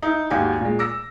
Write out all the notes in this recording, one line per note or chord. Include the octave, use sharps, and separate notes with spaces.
D#4 E4
G#1 D#2 F#4 G4 G#5
A#2 G#3
D6 E6 A#6